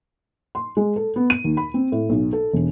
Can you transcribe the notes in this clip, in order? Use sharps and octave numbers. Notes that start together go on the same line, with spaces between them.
C6
G#3
A4
B3
D#7
D#2
B5
C4
A2
B1
A4
E1